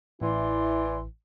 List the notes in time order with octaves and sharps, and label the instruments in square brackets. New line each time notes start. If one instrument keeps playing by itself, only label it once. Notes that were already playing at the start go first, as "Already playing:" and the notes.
[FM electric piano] A1 [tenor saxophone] E3 [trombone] E4 [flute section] D5 C6